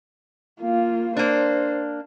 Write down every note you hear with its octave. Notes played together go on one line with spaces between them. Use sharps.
A#3 F4
A#3 D4 C5